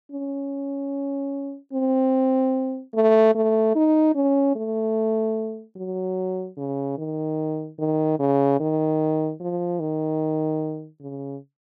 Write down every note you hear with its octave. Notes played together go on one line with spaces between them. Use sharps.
C#4
C4
A3
A3
D#4
C#4
A3
F#3
C#3
D#3
D#3
C#3
D#3
F3
D#3
C#3